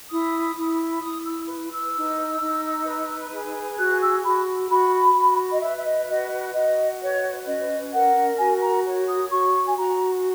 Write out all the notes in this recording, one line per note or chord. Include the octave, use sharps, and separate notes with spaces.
E4 D#6
E4
E4 D#6
E6
B4
E6
D#4
D#4
B4
G#4
F#4 F#6
E6
F#4 B5
F#4 B5
F#4
D#5
B4 E5
E5
D#5
F#4 D#5
F#4 D#5
B4 C#5
C#4 D#5
A#4 F#5
F#4 G#5
A#5
C#5
D#6
F#4 C#6
G#5
F#4 A#5